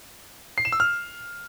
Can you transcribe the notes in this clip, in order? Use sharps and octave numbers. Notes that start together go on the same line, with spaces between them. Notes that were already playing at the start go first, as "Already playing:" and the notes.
C7
E7
E6
F6